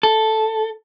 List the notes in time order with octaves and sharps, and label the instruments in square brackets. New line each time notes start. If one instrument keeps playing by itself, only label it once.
[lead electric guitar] A4